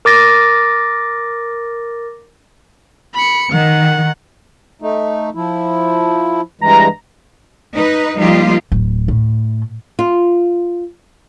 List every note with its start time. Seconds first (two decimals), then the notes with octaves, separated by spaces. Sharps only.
0.05 A#4 D6 A6 A#6
3.15 B5 C#7
3.52 D#3 F#5
4.82 A3 D#4
5.35 F3 E4
6.61 G2 E3 G#3 A#5
7.74 D#4 B4
8.16 F3 G3 A#3 D#4 F4 G4
8.72 D1
9.08 A2
9.99 F4